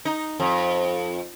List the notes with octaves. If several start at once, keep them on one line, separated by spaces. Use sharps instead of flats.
D#4
F2